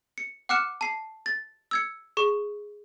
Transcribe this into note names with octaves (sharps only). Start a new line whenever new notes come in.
C#7
F#5 D6 F6 F#6 C#7 E7
A5 C7
A6
E6 G#6 C#7
G#4 C#6